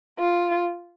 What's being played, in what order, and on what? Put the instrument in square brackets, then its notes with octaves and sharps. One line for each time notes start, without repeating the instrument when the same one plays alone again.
[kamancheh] F4